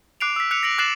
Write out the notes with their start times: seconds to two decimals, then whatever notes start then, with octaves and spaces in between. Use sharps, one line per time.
0.20 D6 F#6 C7 D7 F7
0.36 E6 B6
0.51 F#6 C#7 F7
0.63 A#6 D7 F#7
0.78 D6 F#6 A6 C7 E7 F#7